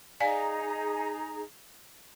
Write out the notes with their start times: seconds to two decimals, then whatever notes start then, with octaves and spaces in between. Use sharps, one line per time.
0.20 D#4 G#4 D5 F5 G#5 A#5